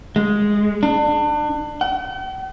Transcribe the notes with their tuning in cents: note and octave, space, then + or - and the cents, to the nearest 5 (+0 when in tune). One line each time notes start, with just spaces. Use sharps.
G#3 -5
D4 +30
G5 -45